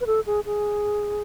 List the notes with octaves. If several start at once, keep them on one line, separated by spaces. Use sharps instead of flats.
B4
A4
G#4
G#4